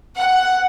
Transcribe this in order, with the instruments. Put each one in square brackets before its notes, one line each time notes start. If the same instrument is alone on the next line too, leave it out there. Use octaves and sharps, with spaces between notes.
[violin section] F#5